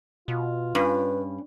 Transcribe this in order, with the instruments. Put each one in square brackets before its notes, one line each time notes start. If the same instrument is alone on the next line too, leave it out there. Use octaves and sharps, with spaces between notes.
[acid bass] B2 [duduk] F4
[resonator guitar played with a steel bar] G2 [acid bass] C#4 [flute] B4